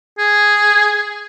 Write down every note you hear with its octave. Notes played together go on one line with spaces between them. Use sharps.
G#4